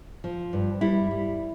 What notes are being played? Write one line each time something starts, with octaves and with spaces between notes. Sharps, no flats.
F3
G2
G3 E4
G3